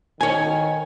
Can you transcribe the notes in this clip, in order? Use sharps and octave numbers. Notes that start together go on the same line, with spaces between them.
D#3 C#5 G#5